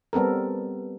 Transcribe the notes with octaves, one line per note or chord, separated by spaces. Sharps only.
G3 B3 C4 A4 A#4